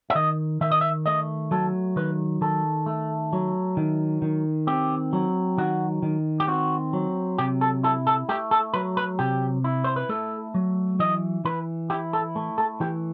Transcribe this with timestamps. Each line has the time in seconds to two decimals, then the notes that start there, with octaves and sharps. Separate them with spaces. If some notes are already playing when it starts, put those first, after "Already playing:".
0.10 E5
0.15 D#3 D#5
0.61 D#3 E5
0.71 D#5
0.81 E5
1.06 A3 D#5
1.51 F#3 A4
1.96 D#3 B4
2.41 D#3 A4
2.86 A3
3.33 F#3
3.77 D#3
4.22 D#3
4.67 C4 G4
5.13 F#3
5.58 D#3 F#4
6.03 D#3
6.40 G4
6.48 C4 F#4
6.93 F#3
7.38 C3 G4
7.61 A4
7.83 E4 A4
8.07 A4
8.29 A3 G4
8.51 A4
8.74 F#3 B4
8.97 B4
9.19 C3 G4
9.64 E4
9.84 C5
9.96 B4
10.09 A3 A4
10.54 F#3
10.99 E3 D#5
11.45 E3 B4
11.90 E4 G4
12.13 A4
12.36 A3
12.58 A4
12.80 E3 G4